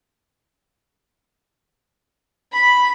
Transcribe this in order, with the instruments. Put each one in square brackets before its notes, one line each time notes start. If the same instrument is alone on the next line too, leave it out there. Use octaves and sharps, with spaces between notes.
[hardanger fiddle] B5